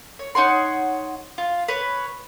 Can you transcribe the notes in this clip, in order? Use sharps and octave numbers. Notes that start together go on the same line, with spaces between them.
C#5
D#4 C#5 F#5 C6
F4
B4 C#5